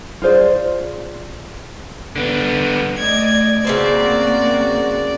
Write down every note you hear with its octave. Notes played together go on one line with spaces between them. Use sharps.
F4 G#4 C5 D5
D3 B3
A3 D5 D#5 G#6
C#3 A#3 C4 F#4 C5 D5